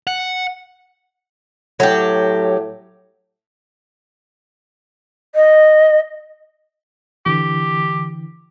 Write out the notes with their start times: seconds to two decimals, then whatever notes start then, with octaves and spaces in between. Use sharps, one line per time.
0.07 F#5
1.80 A2 F#3 G4
5.35 D#5
7.26 D3 E3 G4